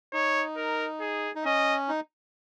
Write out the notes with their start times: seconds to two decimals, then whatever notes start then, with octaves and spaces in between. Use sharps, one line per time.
0.13 D#4 C#5
0.57 A#4
1.00 G#4
1.35 D#4
1.45 C#4 D#5
1.88 D#4